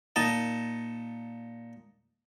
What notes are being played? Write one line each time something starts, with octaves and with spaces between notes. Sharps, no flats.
A#2 D#4 A5